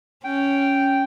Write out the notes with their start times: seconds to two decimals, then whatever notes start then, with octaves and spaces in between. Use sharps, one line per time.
0.24 C#4 G5